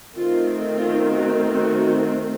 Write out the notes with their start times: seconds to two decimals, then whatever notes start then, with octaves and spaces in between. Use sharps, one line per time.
0.15 D#3 A3 C4 F4
0.78 F4
1.09 F#4
1.42 F#4